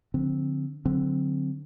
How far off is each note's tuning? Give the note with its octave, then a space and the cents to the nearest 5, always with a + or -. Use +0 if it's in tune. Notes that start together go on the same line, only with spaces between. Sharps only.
D3 +0 F3 +35 C4 +0
D3 +0 F#3 -15 C4 +0